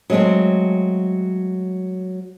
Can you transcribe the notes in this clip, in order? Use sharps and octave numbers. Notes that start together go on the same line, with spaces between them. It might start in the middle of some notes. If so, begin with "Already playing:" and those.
F#3 G#3 A3 C4